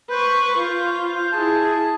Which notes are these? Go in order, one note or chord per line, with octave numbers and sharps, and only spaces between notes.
B4 C5 C#6
F4
E4 G#4 A5